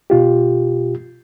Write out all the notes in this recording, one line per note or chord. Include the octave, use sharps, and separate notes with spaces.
B2 F4 G4